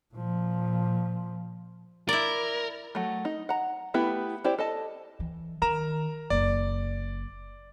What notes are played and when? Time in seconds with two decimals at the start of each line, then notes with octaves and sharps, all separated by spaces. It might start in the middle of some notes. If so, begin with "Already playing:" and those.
0.14 A#2 F3
2.09 E4 A#4 D5
2.95 F#3 A3
3.25 D#4
3.49 F#5 A#5
3.94 A3 B3 E4 G4 B4
4.44 E4 G4 C5 D5
4.59 A4 D#5 A5
5.20 E3
5.62 D#3 A#4 A#5 E7
6.30 F#1 E4 D5